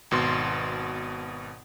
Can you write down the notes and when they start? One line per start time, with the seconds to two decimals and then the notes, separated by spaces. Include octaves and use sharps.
0.11 G#1 B2 C6